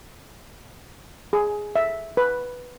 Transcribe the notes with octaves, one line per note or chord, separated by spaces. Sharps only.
G#4
E5
B4